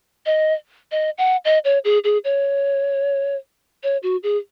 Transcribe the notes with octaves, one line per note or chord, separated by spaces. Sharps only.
D#5
D#5
F#5
D#5
C#5
G#4
G#4
C#5
C#5
F#4
G#4